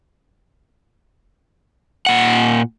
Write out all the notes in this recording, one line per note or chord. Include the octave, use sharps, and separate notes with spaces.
A#2 F#5